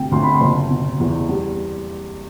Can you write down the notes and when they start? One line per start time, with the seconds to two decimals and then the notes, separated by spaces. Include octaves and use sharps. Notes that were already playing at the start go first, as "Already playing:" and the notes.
Already playing: D2 C3 G5
0.12 D2 C6
0.23 B5
0.34 C6
0.41 F#1
0.70 B2
1.00 E2
1.29 G3